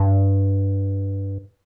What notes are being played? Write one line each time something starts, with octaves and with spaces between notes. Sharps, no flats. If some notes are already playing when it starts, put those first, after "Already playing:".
Already playing: G2